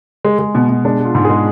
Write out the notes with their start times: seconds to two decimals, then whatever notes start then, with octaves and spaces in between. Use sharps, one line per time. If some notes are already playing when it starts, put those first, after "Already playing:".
0.24 G#3
0.39 G#3
0.55 B2
0.69 B2
0.85 G#3 D4
0.99 G#3
1.05 F4
1.15 G#2
1.25 G#4
1.30 G#3